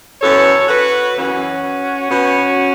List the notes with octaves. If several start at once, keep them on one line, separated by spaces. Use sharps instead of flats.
F#2 E3 B3 A4 C#5
F#4 B4
F#2 E3 B3 C#4 F#4
B2 B3 C#4 F#4